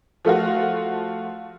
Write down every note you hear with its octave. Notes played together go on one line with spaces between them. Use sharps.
F3 A3 F4 F#4